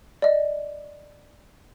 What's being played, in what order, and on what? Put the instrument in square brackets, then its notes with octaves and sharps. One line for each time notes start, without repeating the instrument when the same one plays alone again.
[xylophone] D5 D#5